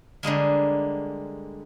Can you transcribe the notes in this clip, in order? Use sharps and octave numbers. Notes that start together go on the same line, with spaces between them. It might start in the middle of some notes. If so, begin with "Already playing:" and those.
D3 G3 G#3 A#3